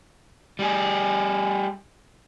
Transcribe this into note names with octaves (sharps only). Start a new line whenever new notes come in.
G3 G#4